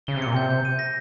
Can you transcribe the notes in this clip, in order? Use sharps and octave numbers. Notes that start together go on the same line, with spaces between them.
C#3 G7
C3
A#2 C#7
C3 G6
G6
D#7
A#6